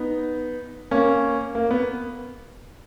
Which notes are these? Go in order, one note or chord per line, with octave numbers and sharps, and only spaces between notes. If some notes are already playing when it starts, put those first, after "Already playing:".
Already playing: B3 D#4
A#3 C#4
A#3
B3